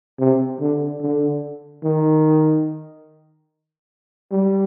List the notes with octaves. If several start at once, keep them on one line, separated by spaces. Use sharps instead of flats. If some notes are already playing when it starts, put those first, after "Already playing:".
C3
D3
D3
D#3
G3